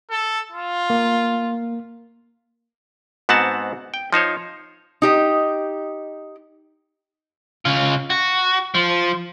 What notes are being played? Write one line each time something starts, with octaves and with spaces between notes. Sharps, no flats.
A4
F4
A#3
G#2 B3 C4 F#4 F#5 A5
G5
F3 D#4 C5 C#5
D#4 G4 D#5
C#3 F4
F#4
F3